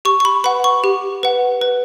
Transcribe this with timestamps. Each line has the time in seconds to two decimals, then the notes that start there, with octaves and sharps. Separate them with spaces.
0.05 G4 C#6
0.20 C#6
0.25 B5
0.44 B4 F#5 B5
0.64 C#6
0.84 G4
1.23 B4 F#5
1.61 B4